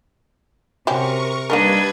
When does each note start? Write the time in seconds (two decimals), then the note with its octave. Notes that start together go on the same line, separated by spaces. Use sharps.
0.87 C3 F#3 C#4 G4 A#4 C#6
1.50 G3 A#3 D4 D#4 A#4 B4 D#5 G#6